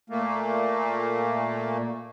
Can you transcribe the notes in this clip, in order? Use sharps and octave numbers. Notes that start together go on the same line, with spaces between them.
A#2 A3 A#3